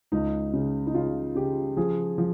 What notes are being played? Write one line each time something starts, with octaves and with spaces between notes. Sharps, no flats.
C#2 D#4
C#3
D#4
C#3 F4
C#3 G4
F3 G#4
F3